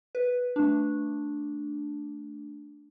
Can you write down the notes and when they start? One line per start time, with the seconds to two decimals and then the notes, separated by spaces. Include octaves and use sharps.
0.15 B4
0.56 A3 D4